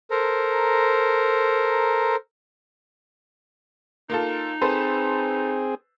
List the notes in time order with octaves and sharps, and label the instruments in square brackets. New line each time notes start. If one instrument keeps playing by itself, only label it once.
[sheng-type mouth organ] A4 A#4 C5 A#5
[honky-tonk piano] A#3 F4 A4 [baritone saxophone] D#4
[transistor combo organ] C4 G#4 [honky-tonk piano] A4 B4 C5